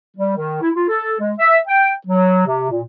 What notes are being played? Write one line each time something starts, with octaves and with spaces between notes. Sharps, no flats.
G3
D#3
E4
F4
A4
G#3
E5
G5
F#3
C3
A#2